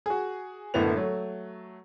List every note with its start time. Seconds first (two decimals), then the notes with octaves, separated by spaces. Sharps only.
0.06 F#4 G#4
0.74 F#1 A2 D3 A3 B3 F7
0.96 F#3 A3